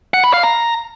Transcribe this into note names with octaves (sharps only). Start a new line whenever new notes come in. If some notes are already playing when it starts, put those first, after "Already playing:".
F#5
B5
F5
A#5